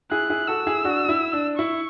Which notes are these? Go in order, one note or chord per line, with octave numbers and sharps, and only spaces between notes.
E4 G#4 F#6
E4 G#4
F#4 A4 E6
E4 G#4
D4 F#4
D4
E4
D4
E4 C#6